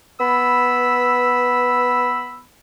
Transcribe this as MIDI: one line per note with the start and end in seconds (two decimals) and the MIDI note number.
0.20 2.42 59
0.20 2.42 83
0.20 2.42 88